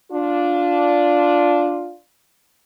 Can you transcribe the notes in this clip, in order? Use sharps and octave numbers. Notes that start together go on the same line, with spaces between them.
D4 F4